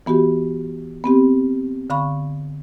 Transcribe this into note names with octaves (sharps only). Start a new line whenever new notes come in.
E3 B3 F#4 G4
B3 C4 G4
D3 F5 B5 C#6